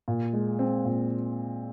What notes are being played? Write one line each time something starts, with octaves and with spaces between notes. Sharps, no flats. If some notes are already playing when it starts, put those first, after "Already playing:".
A#2
G#3
C4
A#2